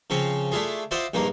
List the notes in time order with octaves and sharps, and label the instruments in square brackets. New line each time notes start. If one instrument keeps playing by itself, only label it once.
[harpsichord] C#3 F3 C4 C#4
A3 D4 E4 F4 G#4
E4 F4 C5 D5 D#5 F#5
A#1 G2 D#3 A#3 A#4